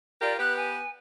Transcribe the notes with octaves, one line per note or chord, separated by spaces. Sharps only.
F4 G4 A#4 D5
B3 G4 B4 F#6
G#5